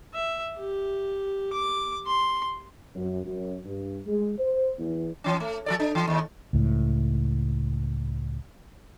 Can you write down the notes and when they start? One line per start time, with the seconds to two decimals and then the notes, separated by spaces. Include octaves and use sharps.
0.14 E5
0.58 G4
1.53 D6
2.06 C6
2.96 F#2
3.26 F#2
3.65 G2
4.07 G#3
4.39 C5
4.79 E2
5.24 E3 C#4
5.40 A3
5.66 F3 A4 D5
5.80 D4
5.95 E3
6.08 D#2
6.53 C#2 A2